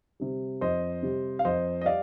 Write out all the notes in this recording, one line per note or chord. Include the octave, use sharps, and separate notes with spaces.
C3 G3
F2 C5 D#5
C3 G3
F5
F2 C5 D#5
D#5
G3 D5 F5